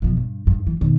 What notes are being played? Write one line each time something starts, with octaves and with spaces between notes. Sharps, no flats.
B2 F3
G2
G2
E3
B2 D#3